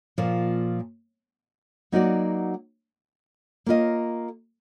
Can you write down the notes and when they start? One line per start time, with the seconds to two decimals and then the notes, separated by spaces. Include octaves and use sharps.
0.18 A#2 F3 A#3
1.92 F#3 A#3 D#4 F#4 D5
3.66 A#3 F4 A#4 D#5